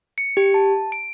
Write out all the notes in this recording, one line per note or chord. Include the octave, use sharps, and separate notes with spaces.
C#7
G4
A5
D7